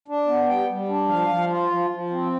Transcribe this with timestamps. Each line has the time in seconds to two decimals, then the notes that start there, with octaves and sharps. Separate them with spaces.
0.08 D4
0.27 B3
0.48 G3 G5
0.69 G3
0.89 D4
1.08 F3 F5
1.29 F3
1.50 F4
1.70 F3
1.90 F3
2.10 C4